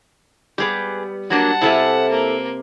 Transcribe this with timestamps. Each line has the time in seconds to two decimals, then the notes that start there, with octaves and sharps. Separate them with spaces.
0.58 G3 B3 G4 G#4 B4
1.30 F#3 A#3 D4 F#5 A5
1.61 C3 E4 A4 E5 F5 G#5
2.10 A#3